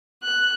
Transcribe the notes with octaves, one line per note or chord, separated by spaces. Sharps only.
F#6